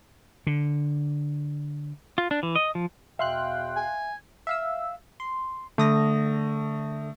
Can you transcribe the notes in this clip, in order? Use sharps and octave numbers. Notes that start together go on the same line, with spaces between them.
D3
F4
D4
E3
D#5
F3
E2 B2 E5 F5 G5 C6 F#6
G#5
E5 F5 E6
C6
D3 A3 D#6 A#6